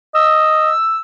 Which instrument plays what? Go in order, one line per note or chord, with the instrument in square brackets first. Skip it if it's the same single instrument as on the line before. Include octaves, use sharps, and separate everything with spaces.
[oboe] D#5 [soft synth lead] E6